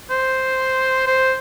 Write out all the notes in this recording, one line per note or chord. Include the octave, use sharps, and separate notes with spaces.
C5
C5